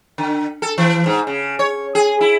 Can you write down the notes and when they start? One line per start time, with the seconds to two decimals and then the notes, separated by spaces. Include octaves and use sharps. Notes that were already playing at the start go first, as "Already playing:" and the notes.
0.18 D3
0.62 A4
0.78 E3
1.06 G#2
1.27 C#3
1.59 C#5
1.95 G#4
2.21 E4